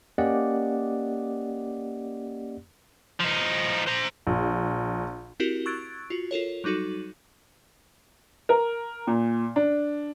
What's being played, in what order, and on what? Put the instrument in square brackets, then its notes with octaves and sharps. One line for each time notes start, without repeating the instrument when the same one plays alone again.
[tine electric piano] A#3 C#4 G4 D5 D#5 F#5
[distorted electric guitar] F3 D#4
C5 A#5
[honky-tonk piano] A#1
[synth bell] C4 E4 F#4 G4 A#4
C#6 E6 F#6 G#6 A6 D7
F4 F#4
F4 A4 A#4 C#5
F#3 G3 D#4 F#4 A4
[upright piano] A#4
A#2
D4